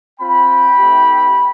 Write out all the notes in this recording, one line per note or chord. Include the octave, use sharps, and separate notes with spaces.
C4 F4 G5 B5
A3 C4 E4 G4